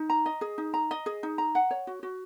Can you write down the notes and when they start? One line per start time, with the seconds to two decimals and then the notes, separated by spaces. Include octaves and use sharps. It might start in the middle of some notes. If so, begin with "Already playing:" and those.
Already playing: D#4
0.10 A#5
0.26 D#5
0.41 G#4
0.58 D#4
0.74 A#5
0.91 D#5
1.06 G#4
1.23 D#4
1.38 A#5
1.55 F#5
1.71 C#5
1.87 F#4
2.03 F#4